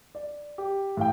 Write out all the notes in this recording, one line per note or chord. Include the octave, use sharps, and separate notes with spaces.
D5
G4
A2 F5 G5